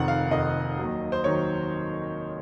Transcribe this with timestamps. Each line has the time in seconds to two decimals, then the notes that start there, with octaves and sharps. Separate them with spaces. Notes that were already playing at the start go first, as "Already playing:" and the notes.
Already playing: F1 F2 D#3 F#5
0.08 F5
0.31 F1 F2 D#3 D#5
0.78 D#2 D#3 F#3
1.12 C5
1.24 D#3 F#3 C#5